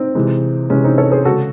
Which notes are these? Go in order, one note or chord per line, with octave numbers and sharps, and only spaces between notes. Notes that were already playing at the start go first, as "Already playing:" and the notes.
Already playing: C4 D#4
C3 E3 G#3
C3 E3 G#3 C#4
C4 D#4
A4 C#5
G#4 C5
C#3 G#3 F#4 A4